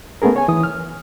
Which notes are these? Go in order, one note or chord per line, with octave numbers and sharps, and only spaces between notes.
A3 B3 C#4 G#4 A#4
C#5 G#5
E3 D#6
F6